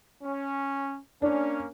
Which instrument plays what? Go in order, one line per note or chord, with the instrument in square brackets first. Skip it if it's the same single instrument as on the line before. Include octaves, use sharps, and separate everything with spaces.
[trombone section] C#4
[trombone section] A#3 C#4 [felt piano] D4